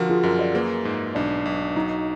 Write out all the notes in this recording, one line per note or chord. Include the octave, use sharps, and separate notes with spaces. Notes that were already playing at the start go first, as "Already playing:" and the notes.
Already playing: D3 F3 F#4 A#4
F4 G#4
F#2 F#4 A#4
A#4 D5
A#3 G#4 B4
G#2
B1 D4
B1
F#3 D#4